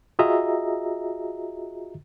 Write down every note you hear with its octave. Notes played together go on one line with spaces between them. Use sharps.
F4 F#4 G#4 D#5 E5 A#5